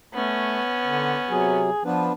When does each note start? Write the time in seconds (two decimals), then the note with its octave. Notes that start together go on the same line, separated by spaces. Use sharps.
0.13 A3 B3 C#4
0.86 D3
1.29 C3 F#3 G#4
1.85 F3 B3 D4 B4